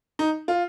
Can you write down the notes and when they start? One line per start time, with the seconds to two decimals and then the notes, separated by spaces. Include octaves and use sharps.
0.19 D#4
0.48 F4